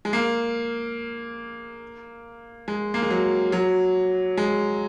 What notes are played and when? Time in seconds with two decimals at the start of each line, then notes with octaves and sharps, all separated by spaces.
0.05 G#3
0.13 A#3
2.68 G#3
2.94 A#3
3.02 G#3
3.11 F#3
3.52 F#3
4.37 G#3